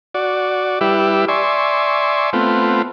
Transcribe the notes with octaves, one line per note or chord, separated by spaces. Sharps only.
F#4 D5
G3 E4 G4 B4 E5
D5 E5 G#5 C6 C#6
A3 B3 C4 F4